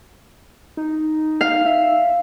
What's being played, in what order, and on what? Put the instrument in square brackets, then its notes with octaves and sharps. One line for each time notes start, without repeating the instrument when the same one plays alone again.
[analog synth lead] D#4
[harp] F5
[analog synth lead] E5